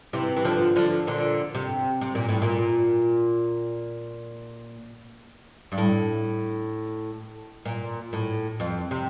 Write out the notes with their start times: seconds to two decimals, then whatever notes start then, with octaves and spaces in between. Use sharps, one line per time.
0.13 C3 E3
0.36 E3
0.45 D3 F3
0.76 D3 F3
1.07 A#2 D3
1.55 C3
2.01 C3
2.15 A#2
2.28 A2
2.42 A#2
5.72 G2
5.78 A2
7.65 A#2
8.13 A2
8.60 F2
8.91 C3